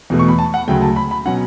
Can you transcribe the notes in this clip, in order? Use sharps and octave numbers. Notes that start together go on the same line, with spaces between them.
E2 B2 A3
C#6
B5
A5
F#5
D2 C#3 F#3 A3 G5
A5
B5
B5
B2 F#3 C#4 F#5